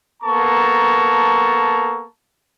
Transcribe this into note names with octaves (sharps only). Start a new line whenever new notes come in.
A#3 B3 A4 A5 A#5 C#6